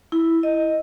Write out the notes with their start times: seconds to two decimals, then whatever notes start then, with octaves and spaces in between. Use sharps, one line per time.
0.12 E4
0.43 D#5